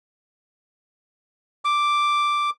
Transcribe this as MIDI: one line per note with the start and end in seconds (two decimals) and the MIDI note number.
1.65 2.50 86